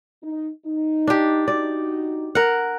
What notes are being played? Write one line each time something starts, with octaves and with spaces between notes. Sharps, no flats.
D#4
D#4
D4 G4
D#4 F#4 D5
A#4 F#5